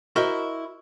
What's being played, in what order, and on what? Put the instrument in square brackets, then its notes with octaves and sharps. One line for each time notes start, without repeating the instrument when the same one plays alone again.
[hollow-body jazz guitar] E4 F#4 A#4 C5 D#5 E5